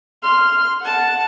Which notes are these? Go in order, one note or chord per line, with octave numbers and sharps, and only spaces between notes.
C6 F6
F#5 A5